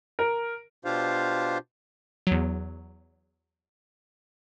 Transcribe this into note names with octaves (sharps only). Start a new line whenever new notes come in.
A#4
B2 D4 F4 G4 C5 F5
E2 F#3